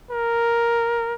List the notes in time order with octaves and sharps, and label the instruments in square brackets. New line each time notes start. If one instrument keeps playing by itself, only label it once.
[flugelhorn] A#4